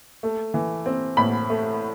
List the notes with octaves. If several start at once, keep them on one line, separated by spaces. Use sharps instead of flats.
A3
E3
C4
A2 B5
A3